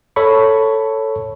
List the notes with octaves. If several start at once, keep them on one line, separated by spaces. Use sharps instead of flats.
A4 C#5 B5 C#6